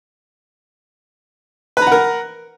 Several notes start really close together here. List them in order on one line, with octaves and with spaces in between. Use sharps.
B4 A#5 F#5 A#4